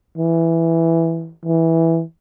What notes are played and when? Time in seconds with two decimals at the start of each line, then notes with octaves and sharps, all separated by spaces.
0.17 E3
1.45 E3